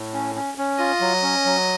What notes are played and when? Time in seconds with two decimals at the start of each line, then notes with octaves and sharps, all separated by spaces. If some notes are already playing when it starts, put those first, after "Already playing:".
Already playing: A2
0.13 C#4
0.35 C#4
0.58 C#4
0.79 F4 D#5
1.01 F#3
1.23 C#4
1.45 F#3